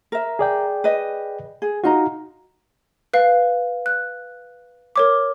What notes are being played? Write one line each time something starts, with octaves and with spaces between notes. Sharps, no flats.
A#4 E5
G#4 D5 G5
B4 D#5
G#4
D#4 F4 F#4 D#5 A#5
B4 F5
F#6
A#4 C#5 D6